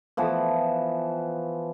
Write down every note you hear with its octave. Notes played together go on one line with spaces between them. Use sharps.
E3 F3 B3